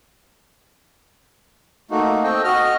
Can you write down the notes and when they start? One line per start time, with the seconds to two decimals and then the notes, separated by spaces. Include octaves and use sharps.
1.91 A3 A#3 D#4 F#4
2.23 C4 A4 D#5 G5
2.44 F#4 D#5 F6